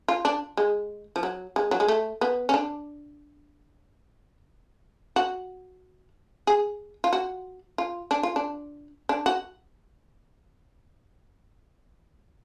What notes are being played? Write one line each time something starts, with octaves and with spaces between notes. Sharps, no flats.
F4
D4
G#3
F3
F#3
G#3
F#3
G#3
A3
B3
C#4
D4
F#4
G#4
F4
F#4
F4
D4
F4
D4
D4
F#4